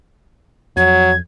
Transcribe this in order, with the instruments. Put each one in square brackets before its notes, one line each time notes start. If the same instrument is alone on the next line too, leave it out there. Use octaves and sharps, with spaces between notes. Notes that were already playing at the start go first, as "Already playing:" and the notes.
[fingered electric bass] F2 [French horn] F#3 [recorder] G#6